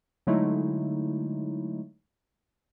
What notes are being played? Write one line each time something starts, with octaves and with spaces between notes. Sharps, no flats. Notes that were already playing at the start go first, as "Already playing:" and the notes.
D3 F#3 G#3 A3 D#4 E4